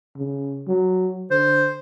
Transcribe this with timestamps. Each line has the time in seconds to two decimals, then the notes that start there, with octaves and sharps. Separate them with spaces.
0.17 C#3
0.68 F#3
1.31 D3 C5